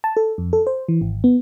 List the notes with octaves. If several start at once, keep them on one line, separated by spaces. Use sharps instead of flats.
A5
A4
F2
A4
C5
E3
G#1
B3